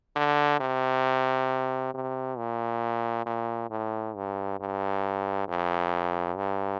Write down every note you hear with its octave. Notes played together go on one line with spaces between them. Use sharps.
D3
C3
C3
A#2
A#2
A2
G2
G2
F2
G2